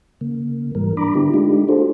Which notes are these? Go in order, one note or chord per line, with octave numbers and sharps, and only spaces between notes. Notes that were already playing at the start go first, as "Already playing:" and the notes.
C#3 A#3
G#2 E3 G3 A#4
D4 A#5 B5 D6
D3 B3 D4 E4 G4
G#3 A3 D4 D#4 F4 G4
D4 F4 F#4 G#4 A4 C5